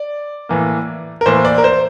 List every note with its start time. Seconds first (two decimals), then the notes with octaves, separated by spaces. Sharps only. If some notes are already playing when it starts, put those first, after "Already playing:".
Already playing: D5
0.49 A2 E3 A#3
1.21 A#4
1.26 A2 E3 A#3 C5
1.45 D5
1.58 A#4
1.64 C5